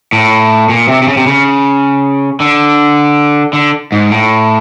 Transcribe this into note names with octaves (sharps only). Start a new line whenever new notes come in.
A2
A#2
C3
C3
C#3
C3
C#3
D3
D3
G#2
A2